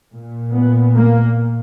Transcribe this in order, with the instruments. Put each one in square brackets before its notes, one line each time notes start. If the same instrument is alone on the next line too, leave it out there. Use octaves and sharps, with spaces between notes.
[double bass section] A#2
B3
A#3